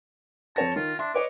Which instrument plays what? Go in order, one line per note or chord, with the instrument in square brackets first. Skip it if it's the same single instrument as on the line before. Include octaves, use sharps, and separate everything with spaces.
[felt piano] F2 C#5 A#6 [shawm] A5
[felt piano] D#3 [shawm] F4
[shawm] D4 [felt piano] E5 C6
[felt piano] B4 C#5 D#5 [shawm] D6